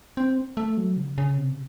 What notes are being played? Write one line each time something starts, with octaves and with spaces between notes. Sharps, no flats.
C4
A3
F#3
C#3
C#3
C3